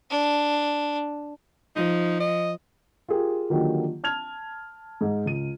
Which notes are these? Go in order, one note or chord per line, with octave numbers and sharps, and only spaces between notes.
D4
F3 D#4
D#5
F4 G4 G#4 A#4
D3 D#3 F3 F#3 A#3 G4
A5 F6 G#6 F7
G#2 G#4
C#2 D#7